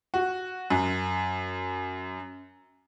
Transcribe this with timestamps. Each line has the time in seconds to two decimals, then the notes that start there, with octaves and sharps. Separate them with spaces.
0.14 F#4
0.70 F#2